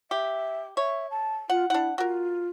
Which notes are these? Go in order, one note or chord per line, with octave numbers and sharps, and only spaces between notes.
G4 E5
C#5 E5
A5
F4 F#5
D4 E4 F#5
F4 F#4 A#4